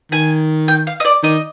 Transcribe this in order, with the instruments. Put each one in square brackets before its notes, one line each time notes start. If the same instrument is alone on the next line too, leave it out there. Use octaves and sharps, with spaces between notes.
[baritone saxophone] D#3 [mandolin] G#5
[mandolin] G5
F5
D#5
D5
[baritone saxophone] D#3 [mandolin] D#5